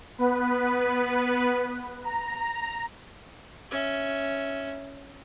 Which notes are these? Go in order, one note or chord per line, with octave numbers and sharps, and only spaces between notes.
B3 B4
A#5
C#4 E5